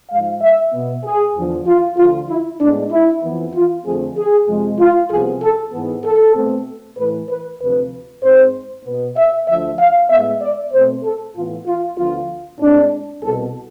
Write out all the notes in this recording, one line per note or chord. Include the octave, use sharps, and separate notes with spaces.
G#2 F3 G#3 F5
E5
B2 B3
G#4
E2 D3 F3
F4
D2 D3 F3 F4
E4
A2 G#3 B3 D4
E4
F2 E3 B3
F4
F2 D3 F3 A3 C4 G#4
G#4
F2 C3 F3 G#3
F4
C2 C3 F3 B3 G#4
A4
G#2 E3 B3
A4
B2 A3 C4
A2 E3 A3 B4
B4
D2 C3 F3 B4
G#2 G#3 C4 C5
B2 B3
E5
D2 D3 F3 E5
F5
A2 G#3 B3 E5
D5
B2 A3 C4 C5
A4
A2 E3 B3 F4
F4
D2 D3 F3 B3 F4
A2 G#3 C4 D4
C2 B2 B3 A4